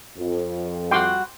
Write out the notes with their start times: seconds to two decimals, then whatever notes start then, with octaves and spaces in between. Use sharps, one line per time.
0.17 F2
0.91 G3 F#4 F#5 G5 C6 D6